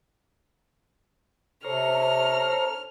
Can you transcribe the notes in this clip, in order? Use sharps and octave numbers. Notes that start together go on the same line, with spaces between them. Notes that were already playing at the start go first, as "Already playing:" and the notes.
C3 A4 C5 C#5 A#5 F6